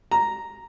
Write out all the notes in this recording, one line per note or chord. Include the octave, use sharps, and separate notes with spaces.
A#5